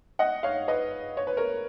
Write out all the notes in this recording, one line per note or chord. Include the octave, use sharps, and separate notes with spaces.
D#5 F#5
C#5 F5
B4 D#5
C#5
B4
A#4 C#5